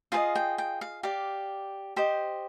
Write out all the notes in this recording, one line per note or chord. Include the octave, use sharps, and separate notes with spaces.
F4 G#4 C5 D#5 F5
G5
G5
F5
G4 D5 F5
G4 C5 D#5